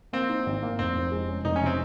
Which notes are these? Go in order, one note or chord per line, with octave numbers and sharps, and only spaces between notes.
A#3 C4
D#4
G#1
A#3
F1 C4
F1
G#3
C#4
F1 D#4
C#4
C3 C4